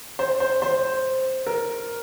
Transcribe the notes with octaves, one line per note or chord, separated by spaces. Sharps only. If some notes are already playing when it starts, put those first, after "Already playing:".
C5
C5
C5
A#4